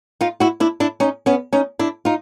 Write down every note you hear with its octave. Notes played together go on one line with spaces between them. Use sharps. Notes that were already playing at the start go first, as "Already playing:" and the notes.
D#4 F4
E4 F#4
D4 E4
D4 E4
C#4 D#4
B3 C#4
C#4 D#4
D4 E4
D#4 F4